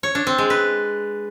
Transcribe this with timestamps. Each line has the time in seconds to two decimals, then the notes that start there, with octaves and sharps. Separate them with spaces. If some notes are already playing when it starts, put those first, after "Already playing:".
0.03 C#5
0.15 D4
0.27 C4
0.38 G#3
0.50 B4